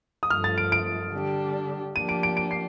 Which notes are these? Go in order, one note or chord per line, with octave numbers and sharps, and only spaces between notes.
D#6
G2 F3 A3 F6
A6
D7
D7
D3 G3 D4 G4
F3 A#3 D4 G4 D#7
D7
D7
D7
C7